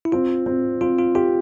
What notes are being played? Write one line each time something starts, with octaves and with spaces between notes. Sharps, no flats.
E4
C4 F4
C4
C4 F4
F4
F4 G4